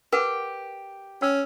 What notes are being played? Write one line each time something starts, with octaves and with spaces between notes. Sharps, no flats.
G4 A#4 B4 F#5
C#4 G5 E6